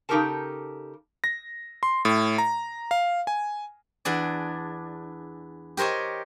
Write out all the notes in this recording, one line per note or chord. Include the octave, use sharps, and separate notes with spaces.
C#3 D#4 G4 A4 A#4 A5
A#6
C6
A2
A#5
F5
G#5
E2 D4 G#4 D5
G4 A#4 C5 C#5 D#5